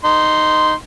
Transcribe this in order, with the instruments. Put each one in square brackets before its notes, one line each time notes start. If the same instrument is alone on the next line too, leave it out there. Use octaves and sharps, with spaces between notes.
[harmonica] D#4 C6